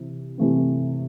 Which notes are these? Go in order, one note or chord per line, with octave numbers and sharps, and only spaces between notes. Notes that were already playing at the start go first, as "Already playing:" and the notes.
Already playing: C3 E3
C3 E3 A3 C4